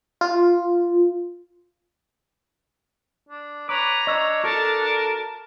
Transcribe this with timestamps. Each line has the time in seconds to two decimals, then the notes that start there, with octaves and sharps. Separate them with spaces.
0.21 F4
3.29 D4
3.69 B4 C#5 A#5 D6
4.07 D4 C#5 D#5 E6
4.44 F#4 A4 A#4 A5